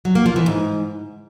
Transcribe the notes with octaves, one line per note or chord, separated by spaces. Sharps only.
F#3
A#3
F3
E3
G#2